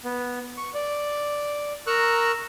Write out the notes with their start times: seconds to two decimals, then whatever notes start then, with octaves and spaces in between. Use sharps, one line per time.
0.04 B3
0.57 C#6
0.74 D5
1.87 A#4 A#5 C#6 E6 F#6